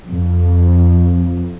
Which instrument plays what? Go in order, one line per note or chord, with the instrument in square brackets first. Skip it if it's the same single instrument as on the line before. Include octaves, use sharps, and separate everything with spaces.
[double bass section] F2